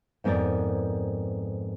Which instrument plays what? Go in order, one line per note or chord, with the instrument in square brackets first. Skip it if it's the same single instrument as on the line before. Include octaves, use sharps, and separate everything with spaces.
[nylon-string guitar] F2 G#2 B3 A#4 D5